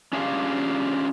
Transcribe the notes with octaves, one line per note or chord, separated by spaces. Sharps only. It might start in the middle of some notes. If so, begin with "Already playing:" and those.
C#4 D4 F4 G4 G#4 F5